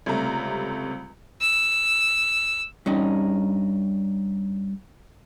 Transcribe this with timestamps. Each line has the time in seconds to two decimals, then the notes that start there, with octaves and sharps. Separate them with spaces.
0.06 C#2 C3 G3 A3 A#5
1.41 E6
2.86 G2 C#4 D#4